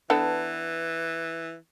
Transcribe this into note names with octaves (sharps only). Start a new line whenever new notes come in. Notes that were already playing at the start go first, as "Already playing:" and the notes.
E3 B3 D4 A4